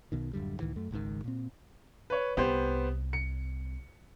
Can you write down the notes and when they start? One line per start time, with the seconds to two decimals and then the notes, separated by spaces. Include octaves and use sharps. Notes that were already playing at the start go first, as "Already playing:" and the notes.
0.12 B1 B2 D#3
0.33 D1 F#2 D3 G3
0.60 C#2 A2 D#3 E3
0.76 F#2 A3
0.91 G#1 C#2 G#2 D#3
1.24 A#2 C4
2.10 B4 C#5
2.37 C2 C3 B3 G4 C5
3.13 C#7